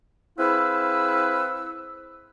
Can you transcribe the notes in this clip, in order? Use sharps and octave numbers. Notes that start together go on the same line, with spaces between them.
C4 E4 G#4 B4 F5 E6